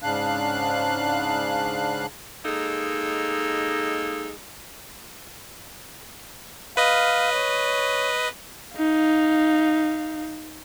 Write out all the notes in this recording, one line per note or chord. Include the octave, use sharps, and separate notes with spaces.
G#2 C#3 D4 F5 F#6
G#3 A#3 D#4 A4
B4 D#5 F5
C#5
D#4 F5